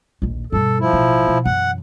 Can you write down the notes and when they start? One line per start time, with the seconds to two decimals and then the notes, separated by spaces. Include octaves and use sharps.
0.22 A#1 D#2
0.52 G2 B2 A4
0.80 F3 E4
0.93 A1 B2
1.28 B2
1.45 F#2 E3 F#5